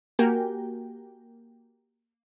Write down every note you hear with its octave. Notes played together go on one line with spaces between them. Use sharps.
A#3 F#4 G4 A#4 G5 G#5